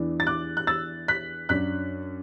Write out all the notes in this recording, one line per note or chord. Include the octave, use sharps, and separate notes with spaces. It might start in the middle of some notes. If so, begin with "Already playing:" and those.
Already playing: E2 E3 D4
A6
D6 F#6
F#6
E6 A6
F#6 B6
F#2 F#3 D4 F#6 B6